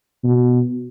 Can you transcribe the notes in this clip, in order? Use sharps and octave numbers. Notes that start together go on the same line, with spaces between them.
B2